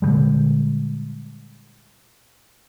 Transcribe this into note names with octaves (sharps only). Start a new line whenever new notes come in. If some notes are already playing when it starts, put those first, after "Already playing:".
A#2 D3 G3 G#3